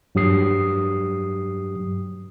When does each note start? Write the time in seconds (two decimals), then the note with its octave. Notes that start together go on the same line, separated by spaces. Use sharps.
0.15 G2 F#3 G4 D#6 C7